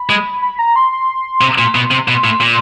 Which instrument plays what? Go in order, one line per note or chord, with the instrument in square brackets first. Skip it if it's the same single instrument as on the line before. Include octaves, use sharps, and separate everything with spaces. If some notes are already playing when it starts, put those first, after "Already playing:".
Already playing: [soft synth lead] B5
[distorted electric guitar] G#3
[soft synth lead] B5
A#5
C6
C6
[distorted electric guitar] C3
A#2
B2
C3
B2
A2
A#2